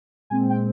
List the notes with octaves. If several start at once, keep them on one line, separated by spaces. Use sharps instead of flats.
A#2 G#3 C4 G#5
G5